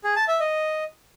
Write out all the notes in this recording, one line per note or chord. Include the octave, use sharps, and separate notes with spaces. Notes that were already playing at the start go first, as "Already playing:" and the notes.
G#4
A5
E5
D#5